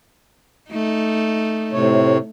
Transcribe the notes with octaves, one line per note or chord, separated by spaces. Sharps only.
A3 D#4
A2 C3 C#5